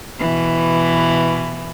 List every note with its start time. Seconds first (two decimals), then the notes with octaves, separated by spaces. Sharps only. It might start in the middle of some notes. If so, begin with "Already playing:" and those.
0.19 B2 E3